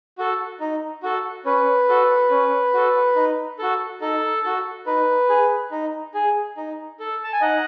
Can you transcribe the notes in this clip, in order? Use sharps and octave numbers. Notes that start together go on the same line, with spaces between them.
F#4 A4
D#4
F#4 A4
C#4 B4
F#4 A4
C#4
F#4 A4
D#4
F#4 A4
D#4 A4
F#4 A4
D#4 B4
G#4
D#4
G#4
D#4
A4
A5
G#5
D#4 D#5 F#5